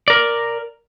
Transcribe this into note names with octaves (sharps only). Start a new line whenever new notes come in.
A#4 D5